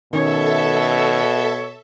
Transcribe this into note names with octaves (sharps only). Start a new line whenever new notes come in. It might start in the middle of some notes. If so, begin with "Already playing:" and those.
B2 D#3 C#4 A4 C#5 E5